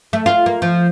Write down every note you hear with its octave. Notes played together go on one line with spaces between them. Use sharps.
A3
F4
A#3
F3